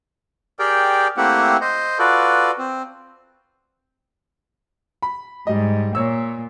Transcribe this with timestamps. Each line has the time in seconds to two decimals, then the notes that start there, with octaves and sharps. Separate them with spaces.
0.59 G4 G#4 A#4 D5 G5
1.17 A3 A#3 C4 E4 G4 F#5
1.61 C5 D#5
1.99 F4 F#4 A4 B4 D5
2.58 C4
5.02 B5
5.47 G#2 G3 D#5
5.95 A#2 C#5 E6